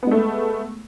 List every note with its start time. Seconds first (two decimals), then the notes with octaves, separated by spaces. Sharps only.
0.03 B3
0.07 G#3
0.11 A3